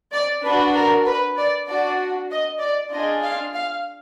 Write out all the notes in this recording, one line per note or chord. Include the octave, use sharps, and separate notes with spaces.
D5
D4 F#4 B4
A#4
B4
D5
D4 F#4 D5
D#5
D5
D4 F4 G#4 D#5
F5
F5